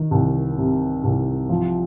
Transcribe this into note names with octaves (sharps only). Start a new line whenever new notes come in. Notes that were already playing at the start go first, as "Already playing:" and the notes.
Already playing: D#3
C2
C3
C2
F3